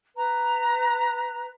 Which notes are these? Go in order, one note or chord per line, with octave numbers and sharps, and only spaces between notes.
B4 A#5